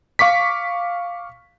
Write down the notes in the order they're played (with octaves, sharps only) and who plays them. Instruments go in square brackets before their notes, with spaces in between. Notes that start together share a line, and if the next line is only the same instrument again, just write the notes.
[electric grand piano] F5 C#6 D6 B6